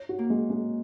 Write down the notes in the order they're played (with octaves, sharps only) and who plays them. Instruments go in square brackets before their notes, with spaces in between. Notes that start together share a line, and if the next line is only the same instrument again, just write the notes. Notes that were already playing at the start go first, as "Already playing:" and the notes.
Already playing: [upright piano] C#5
F#4
[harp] A#3
[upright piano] G#3
G#3